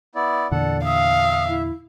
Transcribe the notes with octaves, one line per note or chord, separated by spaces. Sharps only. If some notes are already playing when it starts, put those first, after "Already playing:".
B3 E4 D5
E2 A#2 D3 A4 D5 F#5
E5 F5 D#6
E4